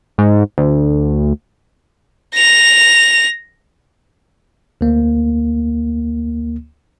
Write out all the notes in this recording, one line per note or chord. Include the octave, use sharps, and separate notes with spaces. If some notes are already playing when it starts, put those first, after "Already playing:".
G#2
D2
A#6 F7
D2 A#3